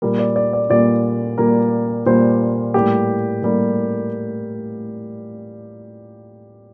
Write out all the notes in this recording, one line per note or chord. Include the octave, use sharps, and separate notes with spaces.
A#2 G3 A#3 A#4
D5
D5
D5
A#2 G3 A#3 D5
A#2 G3 A#3 A#4
A#2 G3 A#3 C5
A2 G3 A#3 G4
A2 G3 A#3